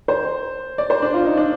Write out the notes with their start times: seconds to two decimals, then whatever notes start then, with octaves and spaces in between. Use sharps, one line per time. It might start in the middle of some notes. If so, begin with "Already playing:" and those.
0.08 C5
0.78 D5
0.90 C5
1.02 D4
1.14 F4
1.25 D#4
1.37 D4